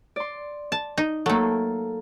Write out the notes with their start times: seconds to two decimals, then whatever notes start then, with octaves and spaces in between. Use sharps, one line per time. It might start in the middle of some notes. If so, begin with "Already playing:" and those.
0.16 D5 C6
0.72 A5
0.98 D#4
1.26 F#3 A3 A#3 A4